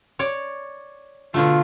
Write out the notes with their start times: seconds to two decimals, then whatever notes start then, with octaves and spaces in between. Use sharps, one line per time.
0.19 C#5 D5
1.34 B2 D3 A3 F4